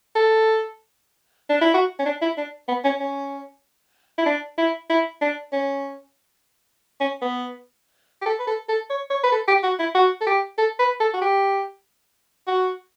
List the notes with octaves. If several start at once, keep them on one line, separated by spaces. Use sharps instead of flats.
A4
D4
E4
F#4
C#4
D4
E4
D4
B3
C#4
C#4
E4
D4
E4
E4
D4
C#4
C#4
B3
G4
A4
B4
A4
A4
C#5
C#5
B4
A4
G4
F#4
E4
F#4
A4
G4
A4
B4
A4
F#4
G4
F#4